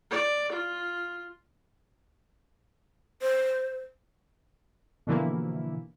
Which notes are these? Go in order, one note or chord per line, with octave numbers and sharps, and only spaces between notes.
D5
F4
C5
B2 D3 E3 F3 A#3 E4